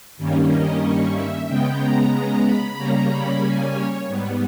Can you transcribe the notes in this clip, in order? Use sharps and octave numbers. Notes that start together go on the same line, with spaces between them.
G2 D#3 G3 A#3 C#4
D#5
C#5
E5
C#3 G#3 B3 G5
A#5
A#5
B5
C#3 G3 A#3 C#4 A#5
B5
G#5
C#5
G#2 G3 B3